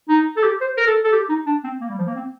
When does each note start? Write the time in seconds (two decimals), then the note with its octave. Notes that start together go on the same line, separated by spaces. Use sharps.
0.09 D#4
0.37 A4
0.43 G4
0.61 C5
0.77 A#4
0.86 A4
1.04 A4
1.12 G4
1.29 D#4
1.46 D4
1.64 C4
1.81 A#3
1.89 G3
1.98 F3
2.07 A#3
2.15 C4